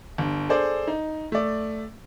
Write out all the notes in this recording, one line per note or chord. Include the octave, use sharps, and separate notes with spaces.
G1
G#4 A4 C5 D5
D#4
A3 D5